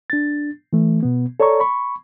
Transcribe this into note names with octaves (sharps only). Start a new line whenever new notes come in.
D4 A6
E3 A3
B2 B3
A4 C#5 D5 A#5 C#6
B5 C#6